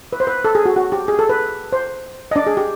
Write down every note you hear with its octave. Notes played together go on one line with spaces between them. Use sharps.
B4
C5
B4
A4
G#4
F#4
F#4
G4
G#4
A4
B4
C5
D#5
D4 D5
G#4
G4